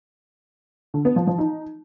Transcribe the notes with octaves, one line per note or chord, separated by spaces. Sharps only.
D3
B3
F3
F3
D#4